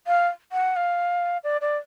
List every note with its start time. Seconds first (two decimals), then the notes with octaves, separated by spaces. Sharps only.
0.07 F5
0.52 F#5
0.76 F5
1.43 D5
1.61 D5